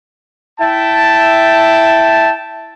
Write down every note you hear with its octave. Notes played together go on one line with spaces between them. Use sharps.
E4 E5 G5 A5